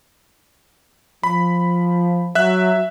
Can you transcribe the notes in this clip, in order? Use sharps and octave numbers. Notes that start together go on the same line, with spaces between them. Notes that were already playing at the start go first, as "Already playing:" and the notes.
F3 B5
F#3 E5 F#6